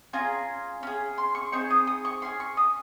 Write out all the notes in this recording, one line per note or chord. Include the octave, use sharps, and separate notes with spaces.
C#4 F4 G#4 A#5
C#4 G#4
C6
C#6
C4 D#4 G#4 C#6
D#6
D#6
C#6
C#4 G#4 C6
C#6
D#6